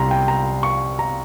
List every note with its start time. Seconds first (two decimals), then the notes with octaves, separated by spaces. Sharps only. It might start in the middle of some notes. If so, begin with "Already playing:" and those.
Already playing: C2 C3 G3 A#5 C6
0.11 G5
0.28 A#5
0.63 C#6
0.99 A#5